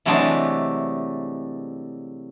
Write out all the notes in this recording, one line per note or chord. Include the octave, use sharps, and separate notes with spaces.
C3 E3 F#3 G#3 A3 D4